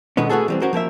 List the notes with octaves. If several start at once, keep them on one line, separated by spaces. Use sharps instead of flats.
B2 D3 D#3 G#3 B3 C#4
A3 B3 F#4 G#4 A4
E3 G3 C4
C#4 F#4 A#4 C5
F3 A#3 A#4 E5